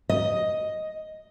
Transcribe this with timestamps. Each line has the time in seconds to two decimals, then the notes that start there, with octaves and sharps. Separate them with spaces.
0.09 D#5